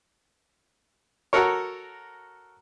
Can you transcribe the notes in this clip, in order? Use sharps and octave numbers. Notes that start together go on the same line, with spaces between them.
F#4 A4 A#4 C#5